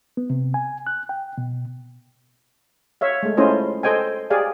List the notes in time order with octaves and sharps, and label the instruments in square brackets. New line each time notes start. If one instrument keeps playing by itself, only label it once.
[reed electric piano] B3
C3
G#5
F#6
G5
B2
[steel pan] C#5 E5 F5
G#3 A3
A3 C#4 E4 F4 C5 D#5
A4 C5 D#5 G5 G#5
G4 G#4 D5 F5 G#5